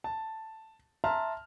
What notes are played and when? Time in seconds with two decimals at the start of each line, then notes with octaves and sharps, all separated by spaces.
0.04 A5
1.04 E5 A5 A#5 C6 F6